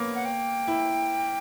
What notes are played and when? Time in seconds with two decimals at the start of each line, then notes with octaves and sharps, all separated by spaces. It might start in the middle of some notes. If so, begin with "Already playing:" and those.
Already playing: A#3 B3 C#4
0.15 F#5
0.25 G5
0.67 E4